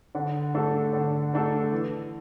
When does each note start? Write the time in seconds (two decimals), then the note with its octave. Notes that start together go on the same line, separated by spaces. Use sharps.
0.15 D3
0.54 A3 D4 A4
0.93 D3
1.33 A3 D4 A4
1.72 E3